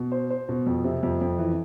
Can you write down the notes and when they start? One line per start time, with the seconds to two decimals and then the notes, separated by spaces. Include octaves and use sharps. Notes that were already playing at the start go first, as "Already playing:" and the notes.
Already playing: B2
0.12 C5
0.30 C5
0.49 B2
0.66 F2
0.84 C3
1.03 F2
1.21 F2
1.39 E3